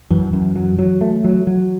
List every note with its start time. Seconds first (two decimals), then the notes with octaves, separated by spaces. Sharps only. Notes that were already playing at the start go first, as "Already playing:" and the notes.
0.11 F#2 E3
0.33 F#2
0.56 F#3
0.79 F#3
1.01 A3
1.24 F#3
1.47 F#3